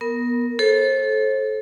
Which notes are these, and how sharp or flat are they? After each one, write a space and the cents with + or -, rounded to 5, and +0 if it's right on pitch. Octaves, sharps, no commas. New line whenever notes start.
B3 -25 A#4 -5
A4 -20 C5 +40